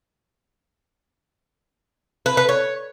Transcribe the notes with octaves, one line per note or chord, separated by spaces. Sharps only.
B4
B4
C#5